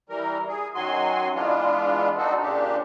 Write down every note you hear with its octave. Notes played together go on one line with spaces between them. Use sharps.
E3 G3 A#4
G#4
F#2 D#3 F#3 F#4 G#5 C6
E3 G#3 B3 D4 F4
C4 D4 D#4 F#4 A4
A#2 C#3 D4 G4